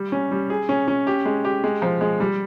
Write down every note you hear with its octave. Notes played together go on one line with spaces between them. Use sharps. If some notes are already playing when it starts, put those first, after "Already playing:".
Already playing: G3
C#4
G3
G#4
C#4
C#4
G4
G#3
G4
G#3
F3
G#3
G3